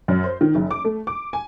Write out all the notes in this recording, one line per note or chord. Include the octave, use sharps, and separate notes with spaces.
F#2
C5
D#3
F#1
D6
A3
D6
G#5